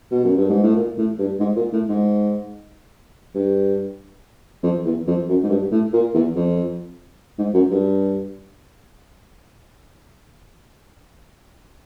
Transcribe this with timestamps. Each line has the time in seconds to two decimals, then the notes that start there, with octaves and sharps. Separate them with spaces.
0.11 B2
0.24 F#2
0.37 G2
0.50 G#2
0.63 A2
0.76 A#2
0.98 A2
1.19 G2
1.40 G#2
1.56 A#2
1.73 A2
1.89 G#2
3.35 G2
4.63 F2
4.85 E2
5.07 F2
5.29 F#2
5.43 G#2
5.50 G2
5.71 A2
5.93 A#2
6.14 E2
6.36 F2
7.38 G#2
7.54 F#2
7.71 G2